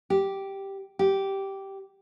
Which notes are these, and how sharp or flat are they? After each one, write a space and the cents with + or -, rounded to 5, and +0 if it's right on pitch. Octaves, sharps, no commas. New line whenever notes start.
G4 -5
G4 -10